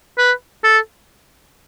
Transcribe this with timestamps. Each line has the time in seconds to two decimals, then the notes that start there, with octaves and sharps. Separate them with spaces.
0.18 B4
0.64 A4